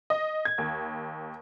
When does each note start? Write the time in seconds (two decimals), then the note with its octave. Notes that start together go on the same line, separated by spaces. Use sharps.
0.10 D#5
0.45 G#6
0.58 D#2